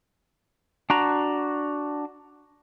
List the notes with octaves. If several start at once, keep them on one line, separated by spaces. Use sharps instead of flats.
D4 F#4 A#5